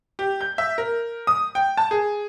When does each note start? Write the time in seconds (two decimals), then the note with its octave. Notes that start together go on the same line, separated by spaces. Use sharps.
0.19 G4
0.41 G6
0.58 E5
0.78 A#4
1.27 D#6
1.55 G5
1.77 A5
1.91 G#4